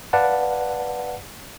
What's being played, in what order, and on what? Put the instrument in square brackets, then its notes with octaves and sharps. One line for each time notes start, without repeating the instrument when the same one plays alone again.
[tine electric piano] B4 D5 F5 F#5 A5